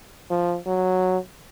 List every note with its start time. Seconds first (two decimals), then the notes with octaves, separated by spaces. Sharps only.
0.31 F3
0.66 F#3